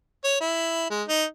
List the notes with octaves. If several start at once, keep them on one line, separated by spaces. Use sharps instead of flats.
C#5
E4
G#3
D#4